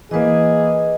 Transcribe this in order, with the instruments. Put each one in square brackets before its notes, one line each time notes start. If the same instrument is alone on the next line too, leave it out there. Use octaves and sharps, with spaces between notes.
[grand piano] E3 A#3 [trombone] G#4 [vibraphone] B4 D#5